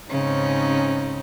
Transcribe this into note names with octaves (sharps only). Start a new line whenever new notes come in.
G#2 C#3 C4 C#4 D#4